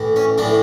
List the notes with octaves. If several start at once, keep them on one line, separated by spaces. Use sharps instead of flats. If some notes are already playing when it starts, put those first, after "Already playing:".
Already playing: A2 E3
C#4
A2 E3 D4